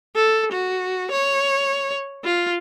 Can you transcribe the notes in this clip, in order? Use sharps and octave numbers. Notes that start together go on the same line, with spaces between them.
A4
F#4
C#5
F4